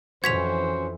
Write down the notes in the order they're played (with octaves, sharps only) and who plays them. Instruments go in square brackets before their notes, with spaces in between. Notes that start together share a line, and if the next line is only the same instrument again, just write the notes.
[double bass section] F2 E3 [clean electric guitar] C#4 F#4 [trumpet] C5 [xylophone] G#6 B6 F7